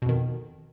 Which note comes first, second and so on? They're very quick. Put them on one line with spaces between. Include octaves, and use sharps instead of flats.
B2 F2 D#3